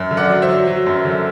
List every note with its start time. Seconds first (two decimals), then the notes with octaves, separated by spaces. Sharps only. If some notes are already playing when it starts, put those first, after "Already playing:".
Already playing: F#2
0.11 D3
0.17 D5 F#5
0.30 F#3
0.42 C5 E5
0.49 F#3
0.67 F#3
0.87 F#2
1.05 D3